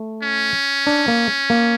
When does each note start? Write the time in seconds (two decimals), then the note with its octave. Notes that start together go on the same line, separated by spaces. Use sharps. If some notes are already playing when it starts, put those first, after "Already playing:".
Already playing: A3
0.23 C#4
0.87 D4
1.08 A#3
1.50 A#3